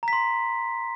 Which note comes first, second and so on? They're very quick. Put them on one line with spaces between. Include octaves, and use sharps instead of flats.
A#5 B6 C6